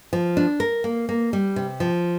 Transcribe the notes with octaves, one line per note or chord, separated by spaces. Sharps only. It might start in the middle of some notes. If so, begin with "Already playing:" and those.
F3
D4
A#4
A#3
A#3
G3
C3
F3